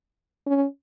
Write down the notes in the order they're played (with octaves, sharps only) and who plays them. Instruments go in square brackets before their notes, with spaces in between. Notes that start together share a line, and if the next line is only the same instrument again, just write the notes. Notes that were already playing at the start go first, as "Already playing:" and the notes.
[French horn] C#4